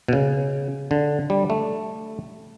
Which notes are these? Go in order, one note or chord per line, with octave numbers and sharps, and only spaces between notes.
B2
C#3
D3
G3
A3